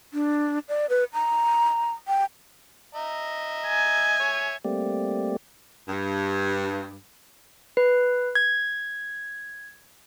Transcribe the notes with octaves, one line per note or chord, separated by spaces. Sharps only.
D4
D5
B4
A#5
G5
D#5 E5 A#5
G#5
C#5 E5
G3 A3 A#3 C4 G4 D5
G2
B4
G#6